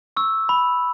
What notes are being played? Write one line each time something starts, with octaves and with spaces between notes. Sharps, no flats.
C#6 E6
B5